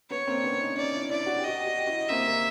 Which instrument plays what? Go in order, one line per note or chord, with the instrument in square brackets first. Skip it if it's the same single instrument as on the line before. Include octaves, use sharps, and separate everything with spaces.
[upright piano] B3 [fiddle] C#5
[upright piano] A#3 C4
D4
B3 C#4
C#4 D#4
[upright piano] C#4 D#4 [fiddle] D5
[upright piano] D4 E4
[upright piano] D4 E4 [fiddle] D5
[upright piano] F#4
G4
[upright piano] F#4 [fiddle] D#5
[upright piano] G4
F#4
G4
E4 F#4
[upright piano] A#3 C4 [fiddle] E5
[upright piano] A#3